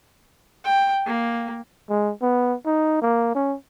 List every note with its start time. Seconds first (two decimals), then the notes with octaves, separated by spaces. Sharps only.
0.65 G5
1.06 A#3
1.89 G#3
2.21 B3
2.66 D#4
3.02 A#3
3.35 C#4